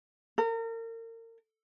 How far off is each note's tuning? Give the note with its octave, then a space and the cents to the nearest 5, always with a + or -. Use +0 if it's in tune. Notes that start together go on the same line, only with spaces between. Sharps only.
A#4 -35